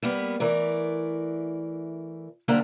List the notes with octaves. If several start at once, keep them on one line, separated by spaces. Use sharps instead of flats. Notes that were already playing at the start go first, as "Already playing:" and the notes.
G3 A#3 B3
E3 A3 A#4 D5
D3 G3 A#3 D4 A#4 C5